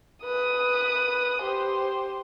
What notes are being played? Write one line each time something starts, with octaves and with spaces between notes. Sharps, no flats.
B4 D#6
G4 C5